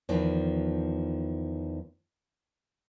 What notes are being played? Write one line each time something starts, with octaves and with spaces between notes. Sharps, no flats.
E2 D#3 F3